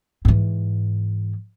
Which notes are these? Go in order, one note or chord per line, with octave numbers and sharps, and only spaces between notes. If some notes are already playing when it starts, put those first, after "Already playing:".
G#2 E3